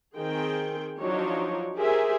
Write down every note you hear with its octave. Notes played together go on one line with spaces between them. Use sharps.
D#3 C4 G#4 G5
F3 F#3 D4 D#4 C#5
G4 G#4 A#4 C5 E5 G#5